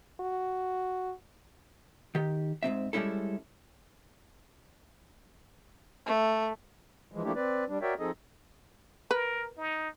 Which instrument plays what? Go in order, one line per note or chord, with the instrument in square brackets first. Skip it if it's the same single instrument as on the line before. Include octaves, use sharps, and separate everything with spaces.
[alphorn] F#4
[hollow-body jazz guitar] D#3 G4
G#2 D3 C4 E5
G3 G#3 C#4 E4 A4
[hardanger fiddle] A3
[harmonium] E3 F3 G#3
F3 A3 A#3 D4 E4 G4
C4 B4 D5
G3 D4
F#4 A#4 C#5 D5 E5 G5
F3 C4 D#4 G#4 A4 D#5
[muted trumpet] A#4 [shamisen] B4
[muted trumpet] D#4